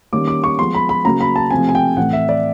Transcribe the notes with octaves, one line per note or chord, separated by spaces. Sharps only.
D#3 G3 A#3 C#4 D6
D6
C#6
F3 G#3 B3 C6
B5
B5
C#3 F#3 A#3 A#5
B5
A5
C3 F3 A3 C4 G#5
G#5
G5
A2 E3 A3 C4 F#5
E5
D5